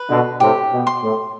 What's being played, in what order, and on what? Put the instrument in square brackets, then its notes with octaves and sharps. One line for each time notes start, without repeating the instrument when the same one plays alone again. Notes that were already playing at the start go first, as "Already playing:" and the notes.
Already playing: [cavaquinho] B4
[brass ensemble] B2 D3
[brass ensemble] A2 C3 [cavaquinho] G4
[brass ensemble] B2
[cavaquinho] C6
[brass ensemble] A2